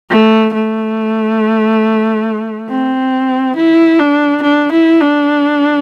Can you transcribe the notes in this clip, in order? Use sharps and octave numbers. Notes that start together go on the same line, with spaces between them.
A3
A3
C4
E4
D4
D4
E4
D4